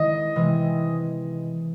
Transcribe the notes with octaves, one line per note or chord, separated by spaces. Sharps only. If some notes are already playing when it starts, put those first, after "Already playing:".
Already playing: D#3 G#3 B3 E4 D#5
C3 E3 G#3